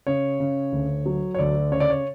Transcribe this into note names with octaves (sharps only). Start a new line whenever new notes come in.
C#3 C#5
C#3
D2
F#3
C#5
D2 D5
C#3 C#5
D5
C#5